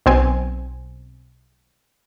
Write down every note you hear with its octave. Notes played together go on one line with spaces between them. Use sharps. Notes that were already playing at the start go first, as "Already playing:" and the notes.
B1 C4 G#5